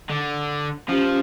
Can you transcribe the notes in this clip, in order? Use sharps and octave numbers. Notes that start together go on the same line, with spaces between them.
D3
F3 C#4 G4